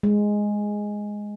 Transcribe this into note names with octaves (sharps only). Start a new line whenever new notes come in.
G#3